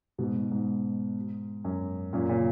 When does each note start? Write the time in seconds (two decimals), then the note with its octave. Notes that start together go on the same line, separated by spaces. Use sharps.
0.18 G#2 B2
0.35 G#2
0.51 G#2
1.65 F#2
2.13 F#2 A#2
2.29 A#2 C#3